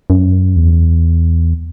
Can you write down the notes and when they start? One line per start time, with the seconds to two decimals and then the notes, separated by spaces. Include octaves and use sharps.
0.10 F#2
0.56 E2